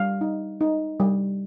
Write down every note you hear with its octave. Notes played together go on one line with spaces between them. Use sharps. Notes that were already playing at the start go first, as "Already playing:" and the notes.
Already playing: G3 F5
D#4
D#4
G3